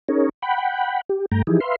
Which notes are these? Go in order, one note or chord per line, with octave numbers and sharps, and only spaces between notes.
C#4 D#4 G#4 A#4 C#5
F#5 G5 B5
G4
G2 A3 G5 A#5
E3 F3 D#4 E4 G4 G#4
B4 E5 F5 C6